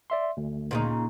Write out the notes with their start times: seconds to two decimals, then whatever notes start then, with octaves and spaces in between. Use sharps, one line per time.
0.10 D5 E5 C6
0.37 D2
0.71 A#2 C#3 D#4